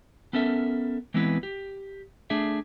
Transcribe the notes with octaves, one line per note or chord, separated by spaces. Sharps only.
B3 C#4 A4 A#4 E5
E3 G#3 B3 C4 E4 B4
G4
A3 D4 G#4 E5